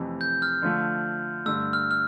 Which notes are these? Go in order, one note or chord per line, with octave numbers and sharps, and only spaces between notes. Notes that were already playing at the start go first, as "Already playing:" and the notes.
Already playing: F2 C3 E3 A3
G6
F6
D3 F3 A3
G2 D3 A3 E6
F6
F6